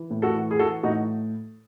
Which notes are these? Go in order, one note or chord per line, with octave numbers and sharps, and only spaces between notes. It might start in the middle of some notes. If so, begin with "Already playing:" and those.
Already playing: E3
A2
F#4 A4
E3
G#4
E3 F#4 A4
A2 D#4 F#4